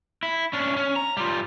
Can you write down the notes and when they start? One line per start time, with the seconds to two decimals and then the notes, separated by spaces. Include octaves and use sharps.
0.23 E4
0.53 C#4 D4
0.77 C#4
0.96 A#5
1.17 G3 F4